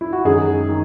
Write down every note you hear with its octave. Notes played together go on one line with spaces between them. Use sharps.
E4
F#4
F#2 D#3 G#3 G#4
D#3